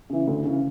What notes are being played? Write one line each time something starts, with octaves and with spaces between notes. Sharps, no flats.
C#3 E3
D2
C#3 E3